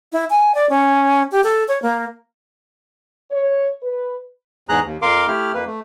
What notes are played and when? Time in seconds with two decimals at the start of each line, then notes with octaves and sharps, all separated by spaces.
0.12 E4
0.30 G#5
0.55 D5
0.69 C#4
1.32 G4
1.44 A4
1.68 C#5
1.82 A#3
3.31 C#5
3.83 B4
4.69 E2 G#2 G#4 A#5 F#6
4.85 D#2
5.02 F2 A#4 F5 C6 D6
5.28 A3 E4 G4 F6
5.54 F2 A#3 B4
5.66 A3